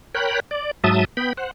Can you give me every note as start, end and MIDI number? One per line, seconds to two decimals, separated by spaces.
0.15 0.40 70
0.15 0.40 73
0.15 0.40 79
0.15 0.40 83
0.15 0.40 90
0.51 0.71 74
0.84 1.05 44
0.84 1.05 54
0.84 1.05 76
0.84 1.05 81
0.84 1.05 87
1.17 1.33 59
1.17 1.33 79
1.17 1.33 83
1.37 1.51 72
1.37 1.51 78